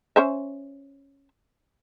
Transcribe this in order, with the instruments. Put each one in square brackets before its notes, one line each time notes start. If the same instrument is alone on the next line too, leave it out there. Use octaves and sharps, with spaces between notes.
[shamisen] C#4 C5 E5